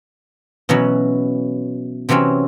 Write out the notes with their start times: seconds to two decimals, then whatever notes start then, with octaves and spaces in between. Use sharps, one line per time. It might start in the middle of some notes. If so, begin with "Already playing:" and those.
0.69 B2 E3 F#3 C#4
2.09 C3 E3 F#3 C4 C#4